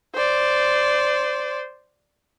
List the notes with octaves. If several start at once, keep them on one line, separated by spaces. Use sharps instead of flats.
C5 D5